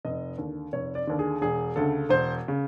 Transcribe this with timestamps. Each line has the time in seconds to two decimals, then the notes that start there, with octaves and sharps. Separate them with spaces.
0.05 F1 D#5
0.38 D#2 D3
0.73 F1 C#5
0.95 D5
1.07 D#2 D3
1.19 G#4
1.41 E1 G#4
1.76 D2 C#3 A4
2.09 E1 C5
2.48 C#3